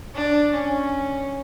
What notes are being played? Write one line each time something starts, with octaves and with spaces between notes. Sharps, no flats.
D4
C#4